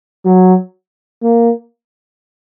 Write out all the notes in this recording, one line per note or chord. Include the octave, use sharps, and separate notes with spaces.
F#3
A#3